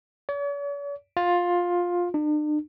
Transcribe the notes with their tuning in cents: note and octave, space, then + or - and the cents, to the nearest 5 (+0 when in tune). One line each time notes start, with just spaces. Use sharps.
C#5 +45
F4 +15
D4 +45